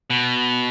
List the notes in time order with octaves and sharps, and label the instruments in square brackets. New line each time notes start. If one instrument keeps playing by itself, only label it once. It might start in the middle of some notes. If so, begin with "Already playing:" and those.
[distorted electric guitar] B2